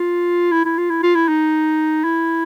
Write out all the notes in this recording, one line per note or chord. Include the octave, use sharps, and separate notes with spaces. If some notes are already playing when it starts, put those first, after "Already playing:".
Already playing: F4
E4
E4
F4
E4
F4
E4
D#4
E4